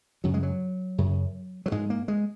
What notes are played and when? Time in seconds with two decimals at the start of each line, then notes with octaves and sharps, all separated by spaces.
0.24 F#2 C#3 F#3
0.34 G#3
0.43 F#3
0.98 F#2 C#3
1.66 F#3
1.72 G#2 G#3
1.90 A#3
2.08 G#3